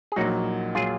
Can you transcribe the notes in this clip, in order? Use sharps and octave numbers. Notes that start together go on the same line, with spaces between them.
G#4
A#1 A#2 F#3 D#4 F#4
A#2 F#3 F4 G#4